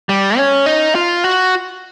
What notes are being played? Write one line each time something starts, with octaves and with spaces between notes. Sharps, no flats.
G3
C#4
D#4
F4
F#4